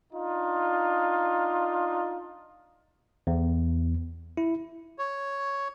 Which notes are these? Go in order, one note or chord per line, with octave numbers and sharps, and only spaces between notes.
D4 D#4 F4
E2
E4
C#5